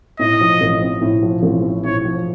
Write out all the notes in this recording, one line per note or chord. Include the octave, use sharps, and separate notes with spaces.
A2 D#5
F3
A1
C4
A2
F3
A1
C4
A2 C#5
F3